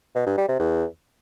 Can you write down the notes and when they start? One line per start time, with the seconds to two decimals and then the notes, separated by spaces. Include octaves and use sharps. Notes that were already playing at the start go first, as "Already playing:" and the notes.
0.15 B2
0.26 G2
0.37 G3
0.48 C3
0.59 E2